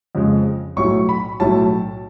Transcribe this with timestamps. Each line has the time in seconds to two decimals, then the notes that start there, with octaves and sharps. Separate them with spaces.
0.15 F2 C#3 G#3
0.76 B1 A2 F#3 C#6
1.09 B5
1.40 B1 A2 F#3 A5